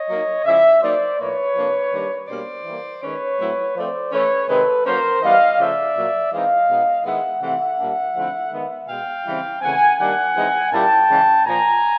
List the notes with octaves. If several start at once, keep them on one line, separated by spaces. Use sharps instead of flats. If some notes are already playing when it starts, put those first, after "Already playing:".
Already playing: C#5 D#5
F#3 A#3 D#4
C#3 F3 G#3 C#4 E4 D5 E5
F#3 A#3 D#4 C5 D5
A2 F3 A#3 B4 C#5
C3 F3 A#3 D4
D#3 G3 A#3 D4
B2 G3 A#3 D4 C5 D5
E3 G3 A#3
D#3 G#3 C#4 B4 C#5
A2 F#3 A3 C4 E4
F3 A3 C4 C5 D5
E3 A3 C#4 E4 B4 C#5
C3 D#3 G#3 C4 A4 B4
F#3 A#3 C#4 A#4 C5
E3 G3 B3 E4 D#5 F5
C#3 F3 A3 D5 E5
A#2 F#3 A#3
E3 G#3 C4 D#4 D#5 F5
B2 G#3 B3 D#4
D#3 G#3 B3 E4 E5 F#5
C3 E3 A3 C4 E5 F#5
A#2 G3 A#3 D4
D3 F3 A3 C4 E4
D#3 G#3 B3
B2 G#3 B3 F5 G5
C#3 E3 G3 C4 E4
C#3 E3 A3 C4 F#5 G#5
D#3 G3 A#3 D4 F#5 G#5
E3 G#3 C4 D#4
A#2 G3 A#3 C#4 E4 G5 A5
C#3 E3 G#3 C#4
A#2 F3 A#3 G#5 A#5